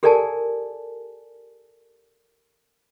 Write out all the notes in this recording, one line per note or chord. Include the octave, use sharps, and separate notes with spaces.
G4 A4 A#4 D5 G#5 A5